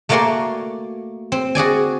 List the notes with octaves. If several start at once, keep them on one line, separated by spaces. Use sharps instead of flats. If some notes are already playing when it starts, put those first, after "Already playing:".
A3 A#3 F#4 D5 G#5 C6
C4
F#4 G#4 D5 G#5